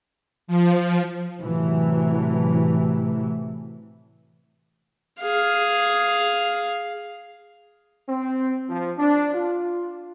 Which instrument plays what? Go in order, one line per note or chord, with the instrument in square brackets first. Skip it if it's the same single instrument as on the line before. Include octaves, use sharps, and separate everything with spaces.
[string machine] F3
[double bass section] A2 C3 E3 F#3 A3
[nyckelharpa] G#4 F5
[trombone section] C4
F3
D4
F4